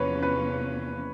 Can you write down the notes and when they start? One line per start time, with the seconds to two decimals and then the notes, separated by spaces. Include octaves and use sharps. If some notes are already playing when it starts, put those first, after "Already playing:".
Already playing: E2 C3 F3 A#3 C#4 B4 C#5
0.22 B4